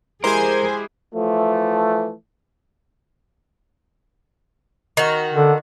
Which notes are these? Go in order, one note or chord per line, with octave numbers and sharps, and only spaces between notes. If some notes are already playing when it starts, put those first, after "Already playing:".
G#3 E4 G4 G#4 A#4 C5 G#5
E3 F3 A3
D#3 F#4
D3